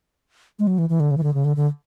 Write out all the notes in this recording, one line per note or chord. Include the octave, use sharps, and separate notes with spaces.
G#3
F#3
E3
E3
D3
C#3
E3
D3
C#3
D3
D3